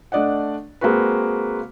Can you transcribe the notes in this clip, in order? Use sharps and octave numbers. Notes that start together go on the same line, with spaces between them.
A3 D4 D5 D#5 F#5
G#3 A#3 C4 F#4 B4